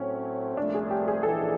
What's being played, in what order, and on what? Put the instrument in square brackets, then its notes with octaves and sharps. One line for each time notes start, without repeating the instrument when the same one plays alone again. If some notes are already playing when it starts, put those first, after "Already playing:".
Already playing: [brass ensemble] A2 F#3 A3 C4 [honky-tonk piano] C#4
[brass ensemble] C2 A#2 F3 A3 [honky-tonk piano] D4
[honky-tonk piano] G#4
G4
G#4
[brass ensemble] A#1 G#2 E3 [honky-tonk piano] A4